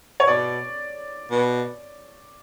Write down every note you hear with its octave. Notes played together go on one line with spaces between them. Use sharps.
C#5
B2 D5
B2